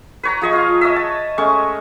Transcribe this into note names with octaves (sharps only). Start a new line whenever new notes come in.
B4 C#5 A#5
F3 G#4 D#5 C#6
F4 F5
C#5 D#5 E5
A5
G#3 A3 C#4 C#6